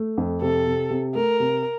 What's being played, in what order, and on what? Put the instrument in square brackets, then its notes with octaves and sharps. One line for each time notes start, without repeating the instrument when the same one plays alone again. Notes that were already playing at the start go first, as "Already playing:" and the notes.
Already playing: [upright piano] A3
F2
[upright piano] C3 [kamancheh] A4
[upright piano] C3
C3
[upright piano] A3 [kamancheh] A#4
[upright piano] C3